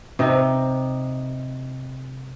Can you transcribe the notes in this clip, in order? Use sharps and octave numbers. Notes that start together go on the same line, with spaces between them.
C3 D#4